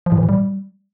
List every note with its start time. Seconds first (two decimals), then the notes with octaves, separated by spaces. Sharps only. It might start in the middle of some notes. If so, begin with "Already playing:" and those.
0.06 F3
0.12 A2
0.18 E3
0.23 A2
0.29 G3